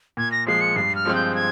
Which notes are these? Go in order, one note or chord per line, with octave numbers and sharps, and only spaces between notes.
A#2 G#6
A#6
F3 G#3 C7
C#7
G2 C7
F6
F3 G#3 C4
G6
G#6